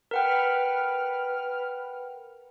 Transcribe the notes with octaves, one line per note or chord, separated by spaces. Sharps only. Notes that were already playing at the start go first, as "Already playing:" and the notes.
A#4 B4 F#5 G5 F6